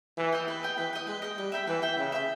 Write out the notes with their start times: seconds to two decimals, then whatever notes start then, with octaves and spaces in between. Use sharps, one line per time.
0.17 E3 B4
0.32 D#5 G5
0.48 B4
0.63 D#5 G5
0.77 E3 B4
0.93 D#5 G5
1.07 G#3 B4
1.22 D#5 G5
1.38 G3 B4
1.52 E5 G5 B5
1.67 E3 B4
1.82 E5 G5 B5
1.97 C#3 B4
2.12 E5 G5 B5